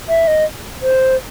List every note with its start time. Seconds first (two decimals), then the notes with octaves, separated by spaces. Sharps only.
0.09 E5
0.27 D#5
0.82 C5